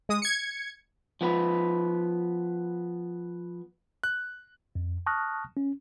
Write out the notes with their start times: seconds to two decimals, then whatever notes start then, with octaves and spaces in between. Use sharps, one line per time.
0.09 G#3 D#6
0.22 G#6 C#7
1.21 F3 B3 B4
4.04 F#6
4.75 F2
5.06 A5 C#6 D#6 F6 F#6 A#6
5.57 C#4